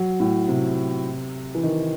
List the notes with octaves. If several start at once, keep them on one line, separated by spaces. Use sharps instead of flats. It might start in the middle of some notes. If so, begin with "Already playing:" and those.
Already playing: F#3
A2
C3
E3
D#3